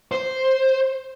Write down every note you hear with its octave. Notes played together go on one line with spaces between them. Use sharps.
C5